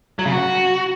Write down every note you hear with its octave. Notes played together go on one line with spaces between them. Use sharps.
F#3
C#3
F#4